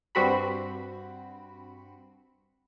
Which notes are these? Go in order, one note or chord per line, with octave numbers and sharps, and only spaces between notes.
G2 C4 F#4 B5